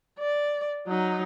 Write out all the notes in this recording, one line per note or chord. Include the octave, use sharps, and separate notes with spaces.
D5
F#3 D#4